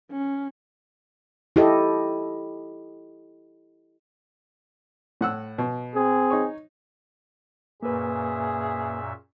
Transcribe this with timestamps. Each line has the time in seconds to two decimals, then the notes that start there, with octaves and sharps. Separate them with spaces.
0.11 C#4
1.56 E4 G4 A4 D#5
5.21 A2 F#5 E6
5.58 B2
5.94 C4 G#4
6.30 D#4 C#5
7.83 F#2 A#2 A#3 G#4 B4 E5